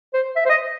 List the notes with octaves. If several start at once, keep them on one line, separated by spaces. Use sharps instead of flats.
C5
E5
C5
D#5